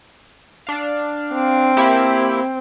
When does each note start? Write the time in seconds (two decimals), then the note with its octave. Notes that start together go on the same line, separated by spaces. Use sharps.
0.67 D4 F5
1.34 C4
1.77 A#3 E4 G4